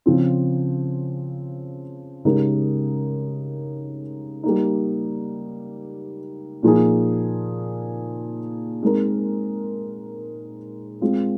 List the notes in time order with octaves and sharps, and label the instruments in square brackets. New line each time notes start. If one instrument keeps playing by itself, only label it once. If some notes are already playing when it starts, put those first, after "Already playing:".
[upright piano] C#3 F3 C4
C#3 G#3 D#4 G4 A#4
G3 A#3 D#4
A#2 F3 A#3 D#4 G#4
G#3 C4 D#4 A#4
G#3 C4 F4